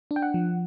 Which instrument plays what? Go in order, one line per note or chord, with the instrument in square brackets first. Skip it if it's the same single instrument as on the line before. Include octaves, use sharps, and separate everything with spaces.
[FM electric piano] D4
G5
F#5
F3